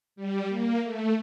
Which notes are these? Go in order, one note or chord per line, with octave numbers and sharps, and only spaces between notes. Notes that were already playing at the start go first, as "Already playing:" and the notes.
G3
A#3
A3